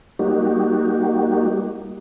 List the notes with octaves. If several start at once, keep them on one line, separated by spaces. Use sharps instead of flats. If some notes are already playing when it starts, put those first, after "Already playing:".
G3 A#3 D#4 F#4 G4